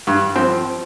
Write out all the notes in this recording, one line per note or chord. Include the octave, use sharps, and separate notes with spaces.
G2
F3 C4